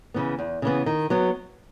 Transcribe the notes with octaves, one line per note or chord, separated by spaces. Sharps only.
C#3 E3 B3
E2
C#3 E3 B3
D#3
F#3 B3